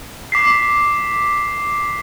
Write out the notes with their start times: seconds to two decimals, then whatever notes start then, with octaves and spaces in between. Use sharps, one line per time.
0.32 D6 B6 C7